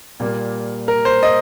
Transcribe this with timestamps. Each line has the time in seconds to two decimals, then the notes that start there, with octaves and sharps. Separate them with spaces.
0.20 A#2 G3 A#3
0.88 A#4
1.05 C5
1.23 D#5